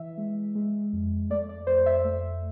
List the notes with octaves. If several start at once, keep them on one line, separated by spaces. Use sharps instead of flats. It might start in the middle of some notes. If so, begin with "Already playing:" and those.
Already playing: E3 E5
G#3
G#3
F2
A3 D5
D5
F2 C5
E5
A3